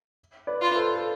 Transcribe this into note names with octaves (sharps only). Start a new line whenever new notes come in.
B4 D5
F4
B4
A4 C5
A4